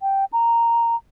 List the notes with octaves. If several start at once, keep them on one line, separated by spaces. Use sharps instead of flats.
G5
A#5